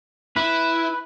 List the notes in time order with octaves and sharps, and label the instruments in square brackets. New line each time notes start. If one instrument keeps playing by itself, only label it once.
[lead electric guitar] E4 [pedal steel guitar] B4